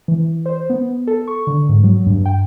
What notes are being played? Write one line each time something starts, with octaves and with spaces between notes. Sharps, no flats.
E3
C5
B3
A4
C#6
D3
G#2
F#3
G2
G5